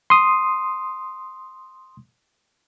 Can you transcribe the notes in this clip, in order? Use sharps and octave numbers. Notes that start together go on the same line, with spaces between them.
C6 D#6